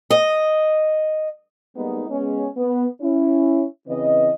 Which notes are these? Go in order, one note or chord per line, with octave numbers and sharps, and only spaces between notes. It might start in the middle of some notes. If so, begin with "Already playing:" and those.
D#5
G3 G#3 A#3 B3 D#4
G#3 B3 C#4
B3
C#4 E4
C#3 E3 C4 B4 D#5